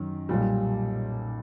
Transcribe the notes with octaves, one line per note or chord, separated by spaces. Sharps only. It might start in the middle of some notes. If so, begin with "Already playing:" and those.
Already playing: F#2 D#3
B1 A#2 G3